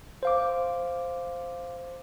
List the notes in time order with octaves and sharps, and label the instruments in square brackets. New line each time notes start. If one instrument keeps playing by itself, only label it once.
[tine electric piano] C5 F5 D6